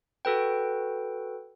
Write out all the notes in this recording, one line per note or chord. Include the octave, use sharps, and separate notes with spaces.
F#4 A4 B4 G5